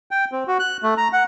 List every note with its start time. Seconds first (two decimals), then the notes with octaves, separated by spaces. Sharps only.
0.11 G5
0.32 C4
0.48 F#4
0.59 F#6
0.83 A3
0.98 A#5
1.13 F#5